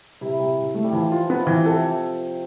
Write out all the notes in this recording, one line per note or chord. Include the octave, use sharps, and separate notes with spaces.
C3 E4
C3
C3
A3
G3
E3 F3
F3 F4
B3
C3 E3
C3 A4